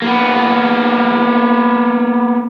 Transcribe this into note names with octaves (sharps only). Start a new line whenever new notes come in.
A#3 B3